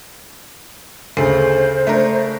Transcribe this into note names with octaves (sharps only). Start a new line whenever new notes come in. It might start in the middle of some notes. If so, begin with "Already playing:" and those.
D2 C#3 A4 C5 C7
A3 D4 A#4